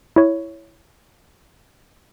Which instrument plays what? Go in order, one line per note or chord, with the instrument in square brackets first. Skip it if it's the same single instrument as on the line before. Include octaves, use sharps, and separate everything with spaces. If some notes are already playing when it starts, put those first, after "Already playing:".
[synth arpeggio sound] E4 C#5